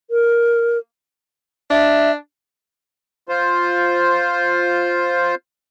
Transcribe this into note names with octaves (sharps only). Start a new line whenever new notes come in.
A#4
D4 E5
F4 C5